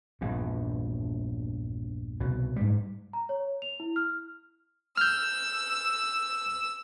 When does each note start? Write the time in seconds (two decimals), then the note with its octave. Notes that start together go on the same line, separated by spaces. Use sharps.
0.21 A#1 E2 G2
2.20 C2 B2
2.56 G#2 G3
3.13 A#5
3.29 C#5
3.62 F7
3.80 E4
3.96 F6
4.97 E6 F6 G6